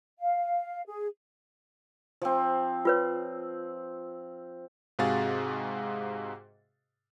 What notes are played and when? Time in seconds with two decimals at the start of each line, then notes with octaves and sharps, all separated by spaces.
0.19 F5
0.87 G#4
2.22 F3 C4
2.85 F4 B4 C#5
4.99 G#2 C3 F#4 G#4 F5 A6